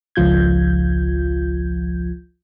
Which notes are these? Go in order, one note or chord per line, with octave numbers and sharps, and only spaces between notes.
G#1 C#2 F3 F4 G6 G#6